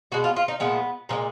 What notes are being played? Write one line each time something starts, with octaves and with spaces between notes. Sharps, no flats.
B2 G#3 F#4
F4
F4
D#4
A#2 F3 G#3 B3
A#2 F3 G#3